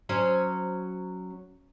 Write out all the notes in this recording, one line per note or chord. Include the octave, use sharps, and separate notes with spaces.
F#3 C#4 C5